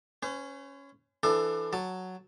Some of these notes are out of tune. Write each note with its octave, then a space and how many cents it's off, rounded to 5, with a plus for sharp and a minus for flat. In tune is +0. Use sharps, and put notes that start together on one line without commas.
C#4 +0 C5 -45
E3 +20 D4 +25 A4 +0
F#3 +0 A5 +0